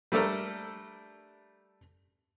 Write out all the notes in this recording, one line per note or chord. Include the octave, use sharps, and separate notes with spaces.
G3 A3 D4 A4 A#4